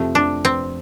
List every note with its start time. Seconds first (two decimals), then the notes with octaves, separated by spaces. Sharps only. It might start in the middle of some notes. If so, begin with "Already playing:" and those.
Already playing: F2 C3 F3 A3 C4 G4
0.15 D4
0.45 C4